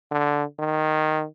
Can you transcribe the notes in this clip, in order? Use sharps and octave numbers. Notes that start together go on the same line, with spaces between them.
D3
D#3